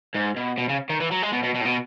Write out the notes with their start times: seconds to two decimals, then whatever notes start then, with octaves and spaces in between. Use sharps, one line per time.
0.15 G#2
0.37 B2
0.58 B2
0.69 C#3
0.89 D#3
1.00 E3
1.11 F#3
1.22 G#3
1.32 B2
1.43 B2
1.54 B2
1.61 A2
1.65 B2